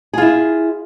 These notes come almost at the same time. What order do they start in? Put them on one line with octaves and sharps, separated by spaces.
G#4 F4 E4